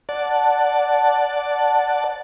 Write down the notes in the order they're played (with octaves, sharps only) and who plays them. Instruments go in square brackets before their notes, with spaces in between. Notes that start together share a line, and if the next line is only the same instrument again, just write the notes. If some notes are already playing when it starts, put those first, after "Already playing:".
[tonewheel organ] D5 F#5 A5